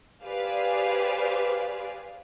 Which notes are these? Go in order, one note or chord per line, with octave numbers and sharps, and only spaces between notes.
G4 G#4 B4 C5 D5 F5